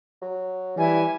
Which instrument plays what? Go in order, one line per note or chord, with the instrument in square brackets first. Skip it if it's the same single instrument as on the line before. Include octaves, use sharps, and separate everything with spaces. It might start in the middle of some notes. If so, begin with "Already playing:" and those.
[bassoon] F#3
[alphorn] E3 [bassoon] G3 [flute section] E4 G#5